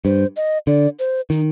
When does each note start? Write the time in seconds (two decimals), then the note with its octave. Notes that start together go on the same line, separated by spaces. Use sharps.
0.05 G2 C5
0.36 D#5
0.67 D3 D5
0.99 C5
1.30 D#3 D#4